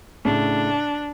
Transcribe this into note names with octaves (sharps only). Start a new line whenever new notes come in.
A2 C#3 D4